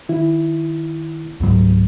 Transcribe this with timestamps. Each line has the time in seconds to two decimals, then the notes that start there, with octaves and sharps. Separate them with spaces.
0.09 D#3 E4
1.40 C#2 G#2 F#3